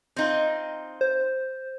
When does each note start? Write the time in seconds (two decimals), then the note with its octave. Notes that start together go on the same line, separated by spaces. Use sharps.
0.16 C4 D#4 F4
1.01 C5